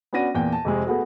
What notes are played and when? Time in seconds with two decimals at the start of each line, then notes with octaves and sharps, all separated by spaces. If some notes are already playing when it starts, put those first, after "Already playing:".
0.13 B3 C#4 D4 F#4 A#6 D#7
0.35 E2 A#2 G5
0.52 A5
0.65 F2 C3 G#3
0.87 A3 B3 F#4 G#4